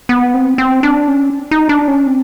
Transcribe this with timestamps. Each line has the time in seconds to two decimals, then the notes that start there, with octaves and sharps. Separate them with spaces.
0.09 B3
0.34 C4
0.58 C4
0.83 D4
1.08 C#4
1.51 D#4
1.69 D4
1.88 C#4
2.07 C4